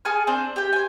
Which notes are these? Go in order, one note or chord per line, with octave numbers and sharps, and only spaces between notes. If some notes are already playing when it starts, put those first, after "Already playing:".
G#4 A4 G#5 F6
C4 D4 C5
G4 G5
C5 G#5